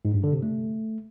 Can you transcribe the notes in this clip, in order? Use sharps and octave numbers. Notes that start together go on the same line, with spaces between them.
G#2
G2
D3
C3
A3